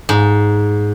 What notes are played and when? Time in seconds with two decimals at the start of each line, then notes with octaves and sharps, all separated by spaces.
0.09 G#2